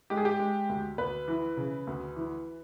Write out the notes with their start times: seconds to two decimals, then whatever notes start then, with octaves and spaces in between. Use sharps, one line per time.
0.10 G#3 G4
0.17 G#4
0.25 G4
0.40 G#3
0.69 D2
0.98 D2 B4
1.28 E3
1.57 C#3
1.87 D2
2.16 E3